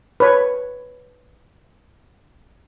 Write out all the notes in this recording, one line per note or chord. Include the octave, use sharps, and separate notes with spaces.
B4 C#5